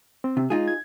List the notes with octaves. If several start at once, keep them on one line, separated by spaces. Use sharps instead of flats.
C4
C3
G#3 D#4 F4 G#4
G#6